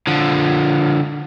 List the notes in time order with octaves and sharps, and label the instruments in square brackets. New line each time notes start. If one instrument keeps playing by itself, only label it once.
[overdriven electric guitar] D3 F3